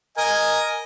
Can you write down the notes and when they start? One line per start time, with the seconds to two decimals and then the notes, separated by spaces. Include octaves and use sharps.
0.18 A#4 D#5 G#5